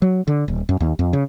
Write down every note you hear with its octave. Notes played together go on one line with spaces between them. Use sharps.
F#3
D3
D#1
F#2
D#2
F2
C#3